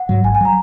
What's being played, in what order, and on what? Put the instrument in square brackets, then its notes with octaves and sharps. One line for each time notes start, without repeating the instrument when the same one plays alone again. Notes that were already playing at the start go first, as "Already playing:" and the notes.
Already playing: [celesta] F#5
[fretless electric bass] G#2 F#3
[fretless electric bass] G#1 [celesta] G#5
[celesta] G#5
[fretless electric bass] F#3 [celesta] A#5